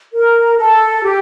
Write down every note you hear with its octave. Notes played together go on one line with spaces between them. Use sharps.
A#4
A4
G4